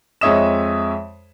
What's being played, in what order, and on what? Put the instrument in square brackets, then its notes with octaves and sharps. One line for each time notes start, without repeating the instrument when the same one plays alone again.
[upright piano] F2 G#3 C#5 E5 D#6 E7